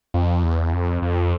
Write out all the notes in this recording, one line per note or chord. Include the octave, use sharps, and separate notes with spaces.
F2
E2
F2
F2